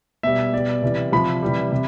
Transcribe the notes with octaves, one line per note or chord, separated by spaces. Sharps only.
B2 G3 E5
B2 G3 D5
C3 E3 G3
C3 F3 B5
C3 E3 G3
C3